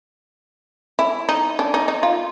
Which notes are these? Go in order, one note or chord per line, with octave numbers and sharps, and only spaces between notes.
E4
D#4
D4
D#4
D#4
F4